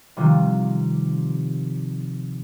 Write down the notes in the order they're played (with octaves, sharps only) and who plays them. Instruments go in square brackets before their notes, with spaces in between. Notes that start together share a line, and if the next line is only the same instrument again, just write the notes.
[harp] C3 D#3 F3 G3